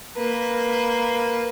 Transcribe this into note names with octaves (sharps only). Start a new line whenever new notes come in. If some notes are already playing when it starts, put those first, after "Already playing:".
A#3 B4